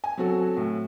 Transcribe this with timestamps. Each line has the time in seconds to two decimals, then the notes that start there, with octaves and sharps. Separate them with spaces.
0.04 G#5
0.17 F#3 C4 F#4 A4
0.57 A2